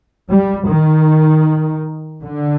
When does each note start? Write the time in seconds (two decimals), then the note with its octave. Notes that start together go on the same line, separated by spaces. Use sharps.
0.30 G3
0.68 D#3
2.22 D3